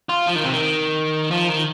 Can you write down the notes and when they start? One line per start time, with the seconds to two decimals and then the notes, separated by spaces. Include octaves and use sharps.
0.09 F4
0.27 F3
0.35 D#3
0.44 C3
0.53 D#3
1.31 F3
1.48 D#3